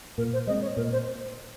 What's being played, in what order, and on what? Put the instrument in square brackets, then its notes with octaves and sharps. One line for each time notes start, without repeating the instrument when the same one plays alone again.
[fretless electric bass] A#2 [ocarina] A#4
[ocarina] C5
[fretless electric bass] G#3 C4 [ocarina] D#5
[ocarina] C#5
[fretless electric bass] A#2 [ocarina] A#4
[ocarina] C5